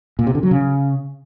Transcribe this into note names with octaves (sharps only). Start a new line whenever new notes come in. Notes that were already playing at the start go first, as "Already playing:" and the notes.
A#2
C3
D3
F#3
C#3